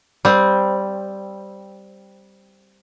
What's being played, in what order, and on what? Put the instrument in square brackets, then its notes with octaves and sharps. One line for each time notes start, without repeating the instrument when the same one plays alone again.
[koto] G3 C4